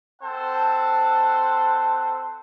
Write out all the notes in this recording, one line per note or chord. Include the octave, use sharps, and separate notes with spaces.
C4 A4 C5 F#5 A5